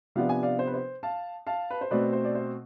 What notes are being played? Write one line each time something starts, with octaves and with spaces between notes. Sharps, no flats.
C3 F3 B3 D4 F5
G#5
D5 F5
C5
B4
C5
F5 A5
F5 A5
B4
C5
B2 A3 C4 B4 D5
C5
D5
C5